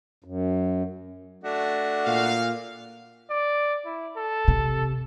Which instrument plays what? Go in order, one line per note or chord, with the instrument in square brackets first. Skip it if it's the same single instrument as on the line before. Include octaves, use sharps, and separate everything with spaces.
[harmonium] F#2
[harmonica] A3 D4 F#4
[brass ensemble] A#2 F5
[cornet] D5
E4
A4
[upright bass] C3